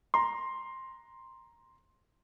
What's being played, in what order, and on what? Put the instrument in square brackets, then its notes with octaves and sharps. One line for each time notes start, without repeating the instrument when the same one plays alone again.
[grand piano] A#5 C6